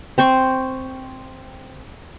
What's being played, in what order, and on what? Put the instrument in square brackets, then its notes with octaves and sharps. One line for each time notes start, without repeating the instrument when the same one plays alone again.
[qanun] C4 C5 C#6